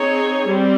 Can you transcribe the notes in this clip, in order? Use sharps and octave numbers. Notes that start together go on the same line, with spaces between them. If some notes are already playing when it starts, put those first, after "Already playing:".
Already playing: C4 D#4 G#4 C#5
G3 C4